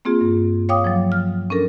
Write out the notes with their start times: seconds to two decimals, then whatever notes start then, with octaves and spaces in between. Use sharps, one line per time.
0.05 A#3 C4 F4 G#4
0.21 G2
0.69 C#5 F5 G5 D6 D#6
0.84 F3 F#3
1.12 F6
1.50 C#4 D4 A4 A#4